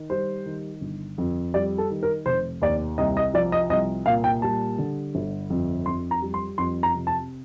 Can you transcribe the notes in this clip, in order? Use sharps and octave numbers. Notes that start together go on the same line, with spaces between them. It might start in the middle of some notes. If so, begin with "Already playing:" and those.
Already playing: D#3
G3 C5
D#3
G1
F2
G3 D5
A4
D#3
A#4
F1 C5
D#2 D5
C2 D#5
D#5
F3 D5
D#5
C2 D#5
A#2 F5
G5
G3 A5
D3
G1
F2
F2 C6
A#5
G3
C6
F2 C6
A#5
C3
A5